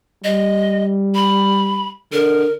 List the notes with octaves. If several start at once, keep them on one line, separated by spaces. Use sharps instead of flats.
G3 D#5
B5
D3 A#4